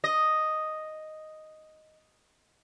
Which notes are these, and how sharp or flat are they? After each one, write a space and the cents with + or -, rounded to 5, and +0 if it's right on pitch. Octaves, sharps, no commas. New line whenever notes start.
D#5 +0